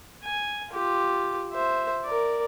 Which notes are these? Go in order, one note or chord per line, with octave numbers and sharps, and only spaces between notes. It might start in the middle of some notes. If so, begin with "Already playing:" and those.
G#5
F4 G4
C5 E5
A#4 D5